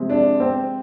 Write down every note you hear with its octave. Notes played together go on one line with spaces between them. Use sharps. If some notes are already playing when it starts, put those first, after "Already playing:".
Already playing: C3 F3 G#3
D4
C4